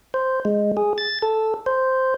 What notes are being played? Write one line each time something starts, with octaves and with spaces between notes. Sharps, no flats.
C5
G#3
G#4
A6
A4
C5